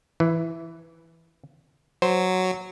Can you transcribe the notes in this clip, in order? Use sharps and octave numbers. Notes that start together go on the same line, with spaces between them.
E3
F#3 C5